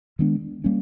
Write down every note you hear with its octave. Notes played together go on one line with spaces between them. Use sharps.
D#3 G#3 B3 D4
G3 A#3 C#4